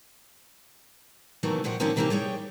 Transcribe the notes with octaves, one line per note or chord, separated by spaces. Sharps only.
C3 D#3 E3 F#3 A3 B3
A#2 F3 F#4 G4
D#3 F3 A#3 C4 C#4 A#4
C3 D#3 E3 A#3 C4 G4
G3 G#4 C#5 G5